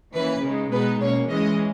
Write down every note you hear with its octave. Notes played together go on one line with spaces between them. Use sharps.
E3 A#3 C#4 B4
C#3 G#3 D#4
B2 G#3 B3 D#4 B4
B2 A#3 C#4 C#5
E3 G#3 C#4 D#5